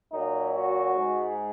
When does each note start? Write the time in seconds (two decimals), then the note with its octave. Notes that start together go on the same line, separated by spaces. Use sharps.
0.12 A#2 F#3 A#3 D#4
0.54 F#4
0.96 G#2 G#3